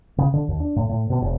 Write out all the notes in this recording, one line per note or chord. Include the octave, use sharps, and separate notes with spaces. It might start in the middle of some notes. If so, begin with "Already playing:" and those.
C#3
D3
D#2
D4
A2
A2
B2
E1